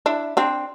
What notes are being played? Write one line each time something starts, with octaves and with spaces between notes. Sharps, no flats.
D4 E4
C4 D4